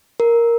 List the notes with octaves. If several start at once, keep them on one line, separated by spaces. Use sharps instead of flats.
A#4